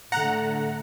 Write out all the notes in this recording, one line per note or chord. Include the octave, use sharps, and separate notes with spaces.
A2 D3 A3 F#5 A#5